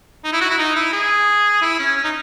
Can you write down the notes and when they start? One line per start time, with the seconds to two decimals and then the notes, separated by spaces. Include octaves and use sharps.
0.24 D#4
0.33 E4
0.41 F#4
0.50 E4
0.58 D#4
0.76 E4
0.93 G#4
1.62 E4
1.79 C#4
1.97 C#4
2.04 D#4